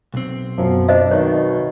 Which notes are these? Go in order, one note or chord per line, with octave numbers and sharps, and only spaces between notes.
B1 C4
F#2 B2 F3
D4 C5 D#5 E5
B2 D#3 C#5